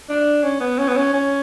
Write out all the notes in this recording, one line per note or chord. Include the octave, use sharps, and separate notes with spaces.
D4
C#4
B3
C#4
B3
C#4
C#4